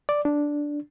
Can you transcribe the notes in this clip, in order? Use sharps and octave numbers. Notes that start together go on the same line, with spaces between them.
D5
D4